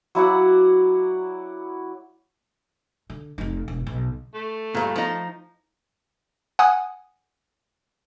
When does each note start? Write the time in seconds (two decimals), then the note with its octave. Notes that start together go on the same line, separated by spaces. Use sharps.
0.15 F#3 E4 D5 F#5
3.10 D3
3.38 F1 D#4
3.68 E1
3.86 B1
4.34 A3
4.75 G2 A#2
4.96 F3 D#4
6.59 F#5 G#5 D#6